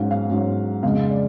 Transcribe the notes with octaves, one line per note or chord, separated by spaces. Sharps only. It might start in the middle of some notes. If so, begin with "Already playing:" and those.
Already playing: G#2 F#3 C#4 F5
F5
G#2 F#3 C#4
F2 C#3 G#3 F5
D5